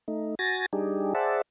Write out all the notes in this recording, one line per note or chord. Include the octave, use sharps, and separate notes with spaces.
A3 D#4
F#4 G#5 A6 A#6
G3 D4 D#4 G4 G#4
G#4 C5 D5 E5 F#5 A5